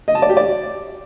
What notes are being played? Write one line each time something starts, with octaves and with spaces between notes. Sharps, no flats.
D#5
A5
D5
G4
D5